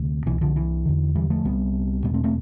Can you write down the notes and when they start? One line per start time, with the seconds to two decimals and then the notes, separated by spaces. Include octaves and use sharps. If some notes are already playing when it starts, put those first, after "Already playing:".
Already playing: D2 C3
0.26 C2 B2 E3
0.41 D3 F3
0.56 E3
0.86 E2 D3
1.15 E3 G3
1.30 F3 A3
1.45 C2 C3 G3 B3
2.04 E2 B2 G3 B3
2.14 A3 C4
2.24 A3 C4